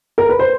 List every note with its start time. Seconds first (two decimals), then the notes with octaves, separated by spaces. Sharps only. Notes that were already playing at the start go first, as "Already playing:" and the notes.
0.18 A#4
0.29 B4
0.39 C5